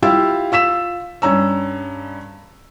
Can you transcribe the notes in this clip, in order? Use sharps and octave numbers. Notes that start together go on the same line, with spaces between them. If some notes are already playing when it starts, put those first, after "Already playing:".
E4 F4 G4 F5 E6
F4 E6 B6 E7
G2 C#4 A#5 E6